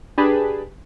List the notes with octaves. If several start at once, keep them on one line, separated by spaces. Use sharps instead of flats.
D4 G4 G#4 B4 A5 B5